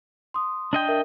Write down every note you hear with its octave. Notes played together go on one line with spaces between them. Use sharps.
C6 D#6
D4 D#5 G5
A#4 E5